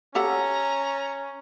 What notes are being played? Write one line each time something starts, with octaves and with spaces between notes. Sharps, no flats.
C#4 G4 A4 F#5 A#5